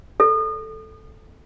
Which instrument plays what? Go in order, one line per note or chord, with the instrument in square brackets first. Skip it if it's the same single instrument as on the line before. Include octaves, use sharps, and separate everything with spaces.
[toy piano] A4